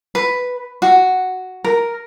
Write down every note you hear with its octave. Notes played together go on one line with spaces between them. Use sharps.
B4
F#4
A#4